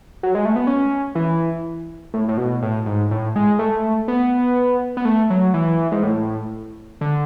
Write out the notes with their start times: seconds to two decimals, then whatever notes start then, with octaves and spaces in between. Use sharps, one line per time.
0.23 F#3
0.35 G#3
0.45 A3
0.56 B3
0.67 C#4
1.15 E3
2.14 A2
2.28 A2
2.37 B2
2.62 A2
2.86 G#2
3.11 A2
3.36 G#3
3.59 A3
4.08 B3
4.97 B3
5.05 A3
5.30 F#3
5.54 E3
5.92 G#2
6.03 A2
7.01 D3